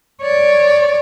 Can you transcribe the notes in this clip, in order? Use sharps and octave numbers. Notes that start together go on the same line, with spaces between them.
C#5 D5